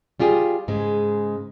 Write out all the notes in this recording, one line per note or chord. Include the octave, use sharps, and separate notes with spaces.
G3 F4 G4 G#4
G#2 C#3 G#3